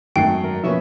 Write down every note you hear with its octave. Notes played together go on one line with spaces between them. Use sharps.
G#1 F#2 D#3 A3 G5 C7
A#4
B2 F3 A#3 B3 C#4 E5